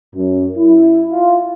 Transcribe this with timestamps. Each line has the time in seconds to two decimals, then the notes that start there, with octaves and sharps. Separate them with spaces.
0.14 F#2
0.56 E4
1.10 F4